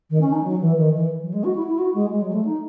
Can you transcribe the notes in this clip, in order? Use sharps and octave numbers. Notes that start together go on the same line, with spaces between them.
D#3
C#4
D#4
F#3
E3
D#3
E3
F#3
G#3
F#4
E4
E4
F#4
G#3
G#3
F#3
A3
D#4